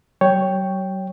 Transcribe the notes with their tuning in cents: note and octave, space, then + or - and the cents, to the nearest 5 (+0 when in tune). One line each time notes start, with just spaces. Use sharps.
F#3 +40 C#5 +0 G5 +0